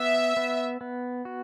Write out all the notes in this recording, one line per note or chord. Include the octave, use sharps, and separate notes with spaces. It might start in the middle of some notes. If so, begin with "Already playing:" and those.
Already playing: B3 E5
B3
B3
F#4